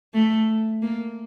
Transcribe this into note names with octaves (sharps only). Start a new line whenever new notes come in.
A3
A#3